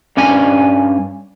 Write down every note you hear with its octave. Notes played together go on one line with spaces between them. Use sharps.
G2 C#4 D4 G#5